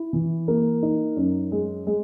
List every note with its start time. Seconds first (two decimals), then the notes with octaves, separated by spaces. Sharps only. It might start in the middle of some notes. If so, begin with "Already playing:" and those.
Already playing: E4
0.13 E3
0.48 A#3
0.83 D#4
1.16 F#2
1.52 G#3
1.87 G#3